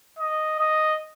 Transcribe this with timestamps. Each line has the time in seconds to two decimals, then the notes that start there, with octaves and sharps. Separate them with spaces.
0.19 D#5
0.60 D#5